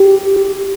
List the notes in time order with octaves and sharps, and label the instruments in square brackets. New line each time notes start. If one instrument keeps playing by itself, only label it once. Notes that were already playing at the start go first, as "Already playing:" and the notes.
Already playing: [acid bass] G4